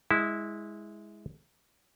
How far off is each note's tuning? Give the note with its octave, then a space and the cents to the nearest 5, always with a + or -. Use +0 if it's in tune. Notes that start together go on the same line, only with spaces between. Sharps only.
G#3 +0 E4 -15